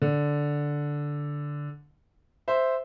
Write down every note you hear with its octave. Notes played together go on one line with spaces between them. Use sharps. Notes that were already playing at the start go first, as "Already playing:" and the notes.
D3
C5 E5